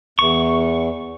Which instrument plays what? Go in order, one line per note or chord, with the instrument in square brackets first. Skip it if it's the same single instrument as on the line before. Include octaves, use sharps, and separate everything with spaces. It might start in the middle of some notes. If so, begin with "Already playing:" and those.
[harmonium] E2 [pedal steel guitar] C#6